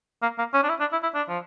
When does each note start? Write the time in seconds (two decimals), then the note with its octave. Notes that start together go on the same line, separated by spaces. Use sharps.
0.22 A#3
0.38 A#3
0.54 C#4
0.63 D4
0.69 E4
0.80 D4
0.92 E4
1.03 E4
1.15 D4
1.29 F3